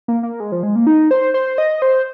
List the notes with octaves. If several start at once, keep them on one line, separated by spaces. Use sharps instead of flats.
A#3
A#3
G#3
F3
G#3
A#3
D#4
C5
C5
D#5
C5